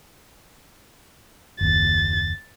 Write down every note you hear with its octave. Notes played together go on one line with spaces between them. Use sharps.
F#1 D#2 A6